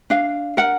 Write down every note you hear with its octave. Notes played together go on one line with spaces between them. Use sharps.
D4 F5
A#4 F#5